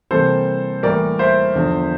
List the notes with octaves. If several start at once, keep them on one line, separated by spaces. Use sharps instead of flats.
C3 E3 G3 A#3 A4 C5
A2 E3 G3 A#3 A#4 D5
C5 E5
E2 D3 F3